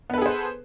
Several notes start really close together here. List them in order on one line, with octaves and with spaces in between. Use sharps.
B3 B4 A4 G#4 C5